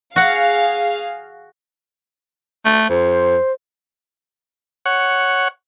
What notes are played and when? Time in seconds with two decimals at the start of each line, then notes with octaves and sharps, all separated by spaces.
0.16 F#4 G#4 F5 F#5
2.65 A3
2.89 F2 C5
4.86 C#5 F#5